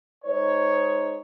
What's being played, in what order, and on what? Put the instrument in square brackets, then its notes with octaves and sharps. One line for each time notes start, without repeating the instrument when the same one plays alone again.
[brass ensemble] G#3 D#4 C5 C#5